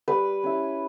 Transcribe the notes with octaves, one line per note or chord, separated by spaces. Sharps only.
G3 B4
C#4 E4